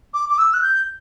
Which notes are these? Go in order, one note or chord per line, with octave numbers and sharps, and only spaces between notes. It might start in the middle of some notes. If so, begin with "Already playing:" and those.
D6
D6
E6
F#6
G6